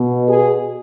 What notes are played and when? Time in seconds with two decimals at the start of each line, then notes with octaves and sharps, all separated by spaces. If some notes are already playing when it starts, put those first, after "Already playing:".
Already playing: B2
0.28 G#4